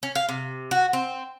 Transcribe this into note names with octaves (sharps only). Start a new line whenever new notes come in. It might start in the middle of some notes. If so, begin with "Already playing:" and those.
C#4
F5
C3
F#4
C4